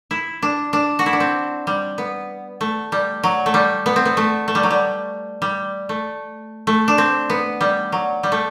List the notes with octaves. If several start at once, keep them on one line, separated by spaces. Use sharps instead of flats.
E4
D4
D4
F#4
E4
D4
C4
G3
B3
A3
G3
F#3
A3
G3
B3
C4
B3
A3
A3
G3
F#3
G3
G3
A3
A3
D4
C4
B3
G3
F#3
G3
A3